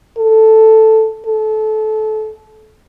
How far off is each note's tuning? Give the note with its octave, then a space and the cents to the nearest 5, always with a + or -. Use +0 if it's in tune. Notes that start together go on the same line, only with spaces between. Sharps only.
A4 +0
A4 -25